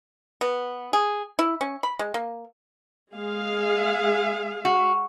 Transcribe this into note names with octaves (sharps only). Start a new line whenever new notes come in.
B3
G#4
E4
C#4
B5
G#3
A#3
G#3 G#4 F5
F#4